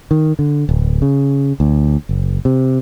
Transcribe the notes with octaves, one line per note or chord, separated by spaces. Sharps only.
D#3
D3
D1
C#3
D2
F#1
C3